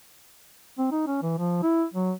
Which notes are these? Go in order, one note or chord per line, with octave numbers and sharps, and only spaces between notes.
C4
D#4
C#4
E3
F3
E4
F#3